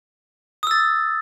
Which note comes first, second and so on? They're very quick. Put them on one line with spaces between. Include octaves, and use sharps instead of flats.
D#6 E6 A6